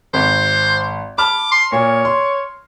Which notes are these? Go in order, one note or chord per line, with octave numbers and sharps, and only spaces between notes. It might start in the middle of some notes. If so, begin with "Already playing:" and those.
G#1 C5
A5 B5 D6 F6
C6
A#2 C#5
C6